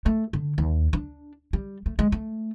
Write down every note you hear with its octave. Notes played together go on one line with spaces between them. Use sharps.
A3
D3
D#2
D4
G3
A3
G#3
A3